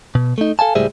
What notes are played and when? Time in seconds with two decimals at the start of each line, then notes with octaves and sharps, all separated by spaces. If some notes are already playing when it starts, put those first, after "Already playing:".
0.15 B2
0.38 A3 D#4
0.59 A4 F5 G#5 A5
0.75 C#2 A2 G3 G#4 C5 E5